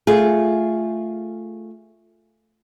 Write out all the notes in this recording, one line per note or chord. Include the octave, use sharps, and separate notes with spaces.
A3 F4 G#4